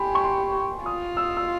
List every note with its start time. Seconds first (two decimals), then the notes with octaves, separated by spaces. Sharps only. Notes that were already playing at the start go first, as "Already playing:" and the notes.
Already playing: G4 G#5 B5 C6
0.15 C#6
0.24 C6
0.85 F4 D#6
1.17 E6
1.37 E6